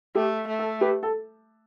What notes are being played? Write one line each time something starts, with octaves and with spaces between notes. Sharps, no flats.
A3 G4
A3
A4
G4 B4
A4